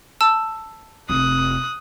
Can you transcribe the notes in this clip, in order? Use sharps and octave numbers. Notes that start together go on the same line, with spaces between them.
A5 E6
F1 D#6 F#6